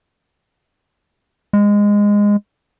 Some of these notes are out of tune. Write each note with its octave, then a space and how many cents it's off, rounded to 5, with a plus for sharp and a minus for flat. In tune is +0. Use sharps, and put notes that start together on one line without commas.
G#3 -15